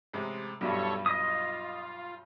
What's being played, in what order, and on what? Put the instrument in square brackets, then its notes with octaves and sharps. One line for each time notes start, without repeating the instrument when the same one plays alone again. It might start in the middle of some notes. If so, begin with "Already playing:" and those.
[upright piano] A1 C3 G#3
[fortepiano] B1 G2 [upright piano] F#3 G3 E4 [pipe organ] A4 C#5
[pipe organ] F4 [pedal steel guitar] D#5 D#6 [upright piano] B6